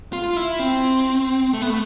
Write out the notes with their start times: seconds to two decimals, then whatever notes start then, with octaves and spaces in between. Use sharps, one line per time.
0.13 F4
0.36 E4
0.59 C4
1.53 A3
1.62 B3
1.70 A3